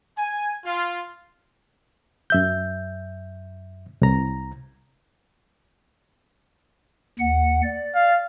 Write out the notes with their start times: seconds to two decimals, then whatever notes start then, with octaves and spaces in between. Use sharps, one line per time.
0.18 G#5
0.66 F4
2.30 F#2 E5 G6
4.02 C2 A#5
7.19 D#2 F#5
7.63 D5
7.95 F5